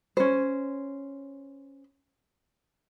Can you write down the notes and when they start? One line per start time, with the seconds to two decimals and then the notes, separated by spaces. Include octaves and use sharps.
0.17 C#4 C5